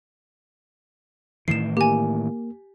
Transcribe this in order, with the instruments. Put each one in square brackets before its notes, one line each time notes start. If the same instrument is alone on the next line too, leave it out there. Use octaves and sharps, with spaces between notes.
[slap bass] A2 D#3 E3 [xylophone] C7 E7
[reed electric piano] A#3 [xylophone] G4 G#5